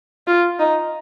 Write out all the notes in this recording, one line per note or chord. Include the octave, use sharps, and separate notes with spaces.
F4
D#4